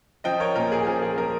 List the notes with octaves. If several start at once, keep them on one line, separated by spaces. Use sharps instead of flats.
F3 D#5 G5
A#4 C#5
A#2 A#4
G#4
F3 A#4
G#4
F3 A#4